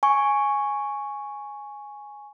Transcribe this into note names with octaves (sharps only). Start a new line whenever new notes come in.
G#5 C#6